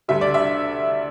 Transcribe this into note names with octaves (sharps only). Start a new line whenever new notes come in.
D2 D3 G3 E5
D5
E5